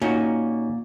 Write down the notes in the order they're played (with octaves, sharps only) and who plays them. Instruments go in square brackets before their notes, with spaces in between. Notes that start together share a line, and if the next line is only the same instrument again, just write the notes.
[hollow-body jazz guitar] A#2 [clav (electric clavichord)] C#4 D#4 F#4